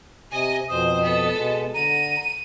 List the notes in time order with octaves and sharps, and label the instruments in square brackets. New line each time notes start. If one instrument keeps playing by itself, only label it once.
[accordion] C3 [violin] D#5 G#5
[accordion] F2 B2 D#6 [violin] C5
[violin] B3 A4
[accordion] B2 G#3
[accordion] D3 A#5 [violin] D#7